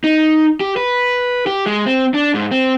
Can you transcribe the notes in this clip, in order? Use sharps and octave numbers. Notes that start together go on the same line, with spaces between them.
D#4
G4
B4
G4
G#3
C4
D4
G#2
C4